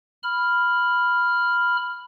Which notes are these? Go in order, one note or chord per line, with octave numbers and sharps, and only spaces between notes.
B5 F6